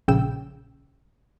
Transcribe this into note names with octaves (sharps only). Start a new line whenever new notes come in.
A#1 C#3 G5 E6